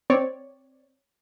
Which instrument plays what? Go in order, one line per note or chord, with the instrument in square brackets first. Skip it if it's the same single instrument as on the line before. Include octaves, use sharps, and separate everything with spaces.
[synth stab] C4 C#5 D5